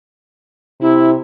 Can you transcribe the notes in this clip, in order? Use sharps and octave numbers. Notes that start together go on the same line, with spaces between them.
C3 E4